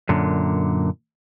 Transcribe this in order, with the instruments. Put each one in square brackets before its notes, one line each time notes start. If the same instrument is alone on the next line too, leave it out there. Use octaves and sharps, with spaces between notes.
[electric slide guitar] F#2 A#2 D3